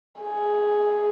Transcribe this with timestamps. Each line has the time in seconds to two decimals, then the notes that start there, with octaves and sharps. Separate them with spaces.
0.20 G#4